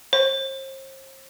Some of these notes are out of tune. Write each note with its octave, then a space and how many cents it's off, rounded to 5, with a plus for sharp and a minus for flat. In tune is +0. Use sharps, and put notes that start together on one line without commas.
C5 +40